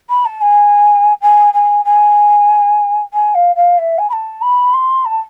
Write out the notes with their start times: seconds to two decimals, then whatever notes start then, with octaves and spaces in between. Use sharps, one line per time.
0.09 B5
0.25 A5
0.41 G#5
1.21 G#5
1.53 G#5
1.85 G#5
3.13 G#5
3.34 F5
3.55 F5
3.78 E5
3.98 G#5
4.09 B5
4.13 A5
4.42 B5
4.73 C6
5.05 A5